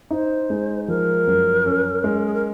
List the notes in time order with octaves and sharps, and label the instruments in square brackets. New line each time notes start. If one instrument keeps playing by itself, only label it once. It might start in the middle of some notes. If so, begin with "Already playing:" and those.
[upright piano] D#4 [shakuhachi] C5
[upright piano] G#3
[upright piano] F3 [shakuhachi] A#4
[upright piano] F#2
C#4
G#3
[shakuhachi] G#4
A#4